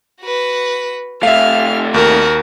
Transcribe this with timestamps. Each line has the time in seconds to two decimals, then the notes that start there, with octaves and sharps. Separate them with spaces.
0.22 F#4 B4
1.23 C3 A3 E5 F5 F6
1.94 D#2 F#4 A#4